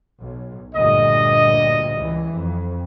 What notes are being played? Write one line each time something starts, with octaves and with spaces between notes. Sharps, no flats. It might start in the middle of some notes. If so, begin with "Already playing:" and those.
B1
D2 G2 A#2 D#5
C#2 E3
F2